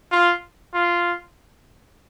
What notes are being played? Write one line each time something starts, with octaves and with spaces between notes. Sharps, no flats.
F4
F4